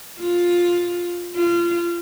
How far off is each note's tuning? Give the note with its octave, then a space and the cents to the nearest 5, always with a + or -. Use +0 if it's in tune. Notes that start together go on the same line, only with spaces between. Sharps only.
F4 +10
F4 -25